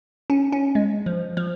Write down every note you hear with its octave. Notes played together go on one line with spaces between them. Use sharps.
C#4
C#4
G#3
F3
F3